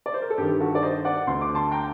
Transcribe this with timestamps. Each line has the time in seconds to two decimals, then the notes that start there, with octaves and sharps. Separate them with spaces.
0.06 D5
0.14 C5
0.22 A#4
0.30 A4
0.38 G2 D#3 G4
0.60 F#4 A4
0.75 D5
0.83 C5 D#5
1.05 D5 F#5
1.27 D2 D3 C6
1.41 D6
1.55 A5 C6
1.72 G5 A#5